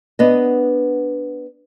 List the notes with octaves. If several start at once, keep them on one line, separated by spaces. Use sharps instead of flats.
B3 D4 D#5